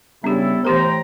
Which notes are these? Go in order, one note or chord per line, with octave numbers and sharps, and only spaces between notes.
C#3 G3 B3 D4 E4 G4 A4
A2 E3 G4 A#4 C5 G5 A#5